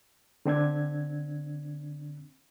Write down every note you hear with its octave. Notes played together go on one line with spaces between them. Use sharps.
D3 C4 D4 G#6